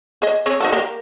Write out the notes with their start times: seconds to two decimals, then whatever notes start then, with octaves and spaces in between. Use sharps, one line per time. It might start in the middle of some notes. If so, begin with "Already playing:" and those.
0.22 G#4 D#5
0.46 C4 G#4 C#5
0.61 D#4 F#4 A4
0.72 A#3 G4 A#4